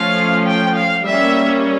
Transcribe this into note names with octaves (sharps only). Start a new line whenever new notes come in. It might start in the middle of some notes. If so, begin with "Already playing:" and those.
Already playing: F3 A3 C#4 F5
G5
F5
G3 A#3 C#4 E5